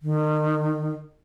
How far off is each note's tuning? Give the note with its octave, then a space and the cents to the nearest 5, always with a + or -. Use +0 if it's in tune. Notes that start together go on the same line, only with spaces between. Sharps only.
D#3 -35